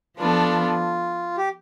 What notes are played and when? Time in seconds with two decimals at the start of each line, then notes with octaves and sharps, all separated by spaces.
0.19 F3 B3 D4 F4 A4
1.37 G4